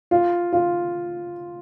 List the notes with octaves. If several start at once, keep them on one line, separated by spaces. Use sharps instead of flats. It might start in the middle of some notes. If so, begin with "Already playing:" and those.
F4
F4